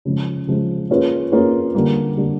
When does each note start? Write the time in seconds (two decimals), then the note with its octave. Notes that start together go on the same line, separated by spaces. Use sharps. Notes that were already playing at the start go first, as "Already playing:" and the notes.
0.05 C#3 F3 G#3
0.47 C#3 F3 G#3
0.90 A#3 C#4 F4 G#4 B4
1.32 A#3 C#4 F4 G#4 B4
1.75 D3 G3 A#3
2.16 D3 G3 A#3